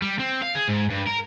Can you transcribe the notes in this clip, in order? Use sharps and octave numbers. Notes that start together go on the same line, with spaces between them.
G3
C4
F5
G#4
G#2
G2
A#4